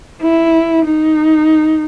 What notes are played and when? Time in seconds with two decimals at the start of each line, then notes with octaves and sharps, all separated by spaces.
0.22 E4
0.85 D#4